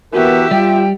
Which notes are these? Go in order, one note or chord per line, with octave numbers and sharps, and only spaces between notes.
E3 B3 F#4 G4 A#4 E5
G3 F4 G5